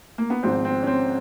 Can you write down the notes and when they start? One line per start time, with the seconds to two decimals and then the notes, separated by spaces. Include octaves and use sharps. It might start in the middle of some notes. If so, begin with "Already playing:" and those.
0.18 A#3
0.30 B3
0.43 G#1 G#2 F3 C4
0.65 C4
0.83 C#4
0.87 C4